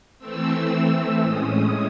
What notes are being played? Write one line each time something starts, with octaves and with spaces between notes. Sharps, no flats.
E3 A3 C4 E6
A2 G#3 C#4 D#6